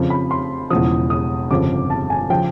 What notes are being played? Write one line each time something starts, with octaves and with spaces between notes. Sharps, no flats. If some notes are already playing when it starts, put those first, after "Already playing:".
Already playing: F2 C#3 F3
B5
C6
E1 E2 C#3 F3 D#6
D#6
G1 F2 C#3 F3 D6
A5
G#5
C#3 F3 G5